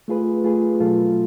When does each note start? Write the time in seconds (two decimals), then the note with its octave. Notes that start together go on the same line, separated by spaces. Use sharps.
0.08 A3 F4 G#4 B4
0.44 A3 F4 G#4 B4
0.80 B2 F#3 A3 F4 A4